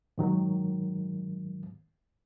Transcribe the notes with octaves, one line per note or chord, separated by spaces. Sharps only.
G#2 D#3 F#3